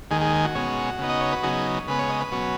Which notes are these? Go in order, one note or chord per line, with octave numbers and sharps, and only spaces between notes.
D#2 D#3 G#3 G#4
G#4
G#5
F#4
B2 G#3 C#4
C#3 B3 D#4
D#5
C#5
B4
C#3 F#3 B3 D#4 G#4
C#3 G#3 B3 B4
C#5
D#5
B4
B2 F#3 C#4